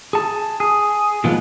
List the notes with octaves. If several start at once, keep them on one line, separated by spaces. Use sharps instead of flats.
G#4 A5
G#4
A#2 D#3 F3 G#3 B3 F4